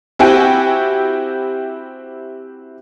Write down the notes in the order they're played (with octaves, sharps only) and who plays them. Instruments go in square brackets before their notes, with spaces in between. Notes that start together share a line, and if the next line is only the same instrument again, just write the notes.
[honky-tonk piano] C4 E4 F#4 G4 G5 G#5